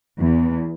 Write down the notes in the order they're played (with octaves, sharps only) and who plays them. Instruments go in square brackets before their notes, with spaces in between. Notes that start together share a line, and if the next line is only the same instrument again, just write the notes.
[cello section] E2